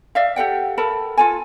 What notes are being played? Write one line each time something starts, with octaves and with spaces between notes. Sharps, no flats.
D5 E5 F5
G4 A4 F#5 G5
A4 A#4 A5 B5
F4 A4 G#5